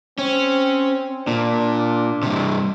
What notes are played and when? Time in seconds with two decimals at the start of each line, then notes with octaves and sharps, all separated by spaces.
0.18 C4 C#4
1.28 A#2 D4
2.23 G2 C3